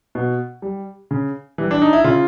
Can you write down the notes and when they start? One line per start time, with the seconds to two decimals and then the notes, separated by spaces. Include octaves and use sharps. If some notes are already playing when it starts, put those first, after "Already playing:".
0.15 B2
0.62 G3
1.11 C#3
1.58 E3 G3
1.71 D4
1.82 D#4
1.93 E4
2.04 C#3 F4